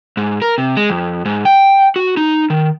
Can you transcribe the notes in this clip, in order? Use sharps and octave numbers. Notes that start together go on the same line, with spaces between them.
G#2
A#4
C3
G#3
F2
G#2
G5
F#4
D#4
D#3